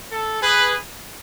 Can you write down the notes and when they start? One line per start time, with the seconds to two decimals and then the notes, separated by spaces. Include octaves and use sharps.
0.12 A4
0.42 G#4 B4